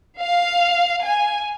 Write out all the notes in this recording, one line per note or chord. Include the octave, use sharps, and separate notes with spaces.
F5
G#5